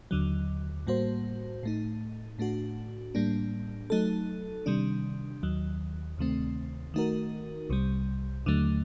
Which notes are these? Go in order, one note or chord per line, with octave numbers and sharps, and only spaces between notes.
D#2 D3 F#3
A2 G3 A#3 F#4 C5
A2 A3 D#4
A2 A3 D4 F#4
A2 G3 A#3 D4
F#3 A3 D#4 A4
C3 D#3 G3 D4
D#2 D#3 F#3
D2 C3 D#3 A3 C4
D#3 A3 D#4 F#4 A#4
C2 C3 G3
D#2 D3 F#3 A3